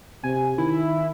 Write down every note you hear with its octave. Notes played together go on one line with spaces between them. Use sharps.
C3 G#5
D#3 E4